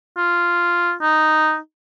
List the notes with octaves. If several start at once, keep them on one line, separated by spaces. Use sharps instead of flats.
F4
D#4